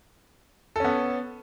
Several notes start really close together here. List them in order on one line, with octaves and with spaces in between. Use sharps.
A4 C#4 B3